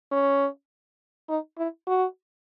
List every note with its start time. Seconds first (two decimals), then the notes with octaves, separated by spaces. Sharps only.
0.12 C#4
1.29 D#4
1.58 E4
1.87 F#4